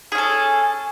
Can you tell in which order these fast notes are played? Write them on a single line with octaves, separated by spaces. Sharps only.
G#4 C#4 A4